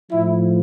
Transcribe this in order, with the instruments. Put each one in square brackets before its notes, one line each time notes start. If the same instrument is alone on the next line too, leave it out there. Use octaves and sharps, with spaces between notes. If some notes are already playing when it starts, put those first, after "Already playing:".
[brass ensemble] A2 F3 E4